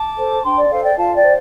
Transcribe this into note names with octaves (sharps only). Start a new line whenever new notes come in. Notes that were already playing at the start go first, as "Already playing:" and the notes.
Already playing: A5 D6
A4 C5
D4 G5 C6
D5
A4 C5 F5
D5 G5
F4 F5 A5
D5 G5
C5